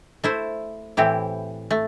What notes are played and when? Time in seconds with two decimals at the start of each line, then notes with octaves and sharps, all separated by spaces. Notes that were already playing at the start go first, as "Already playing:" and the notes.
0.24 A3 E4 C5
0.97 A2 E3 C4 E4 G4
1.71 A3